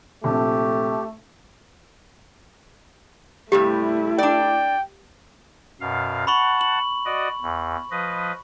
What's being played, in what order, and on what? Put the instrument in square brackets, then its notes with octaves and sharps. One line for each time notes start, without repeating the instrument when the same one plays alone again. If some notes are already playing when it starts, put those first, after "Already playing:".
[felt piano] A#1 C3 [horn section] A3 [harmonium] G4
[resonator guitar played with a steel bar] G2 C3 G3 [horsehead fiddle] A3 E4 [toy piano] G4
[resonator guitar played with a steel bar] D4 D5 [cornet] G5
[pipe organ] F#2 B2 F5
[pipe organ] F#5 A5 [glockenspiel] B5 C#6 F#7
[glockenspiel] F#7
[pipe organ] F#4 D5 D#5
E2
F3 B4 D#5